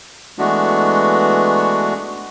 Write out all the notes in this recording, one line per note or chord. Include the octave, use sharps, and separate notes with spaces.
E3 G#3 A3 B3 D4 F#4